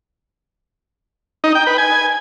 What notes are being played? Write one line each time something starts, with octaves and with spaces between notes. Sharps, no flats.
D#4
G5
B4
G#5